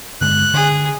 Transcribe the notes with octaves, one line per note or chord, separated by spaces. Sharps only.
G2 D3 G#3 F#6
D3 G#4